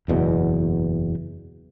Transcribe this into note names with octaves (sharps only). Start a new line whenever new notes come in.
F#1 E2 B2